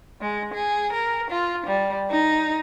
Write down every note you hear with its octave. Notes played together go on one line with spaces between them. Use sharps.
G#3
G#4
A#4
F4
G3
D#4